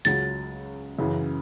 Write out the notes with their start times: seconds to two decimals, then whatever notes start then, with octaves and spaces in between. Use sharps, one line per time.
0.05 C#2 C#3 F#3 A6
0.99 F#2 C#3 E3